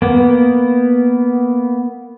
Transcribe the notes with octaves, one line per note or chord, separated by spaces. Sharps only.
A#3 B3